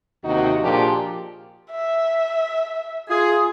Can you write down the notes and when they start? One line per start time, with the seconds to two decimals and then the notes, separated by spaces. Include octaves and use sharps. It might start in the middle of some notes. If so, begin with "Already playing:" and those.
0.25 D#2 C3 D#4 F#4
0.62 A#2 F3 D4 F4 G4 G#4
1.71 E5
3.10 F4 G#4